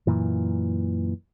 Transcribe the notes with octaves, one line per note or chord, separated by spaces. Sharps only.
F#2 A#2 E3